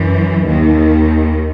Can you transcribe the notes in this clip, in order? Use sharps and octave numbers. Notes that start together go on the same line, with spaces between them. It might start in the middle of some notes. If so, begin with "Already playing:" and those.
Already playing: F#2 E3
D#2 D#3